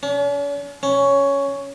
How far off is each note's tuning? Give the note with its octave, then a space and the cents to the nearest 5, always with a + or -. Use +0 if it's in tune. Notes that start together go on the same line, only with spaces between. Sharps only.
C#4 +45
C#4 +5